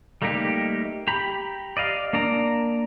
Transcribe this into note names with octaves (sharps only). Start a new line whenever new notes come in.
G3 A3 A#3 D#4 G4
G4 A#5 B5
D5 D#5 F5
A#3 D4 D5 A#5